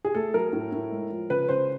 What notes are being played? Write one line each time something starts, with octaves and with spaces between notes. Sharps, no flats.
G#4
A3 A4
F#3 A#4
A2
A2
G#3
F3
C#3 B4
C#3 C5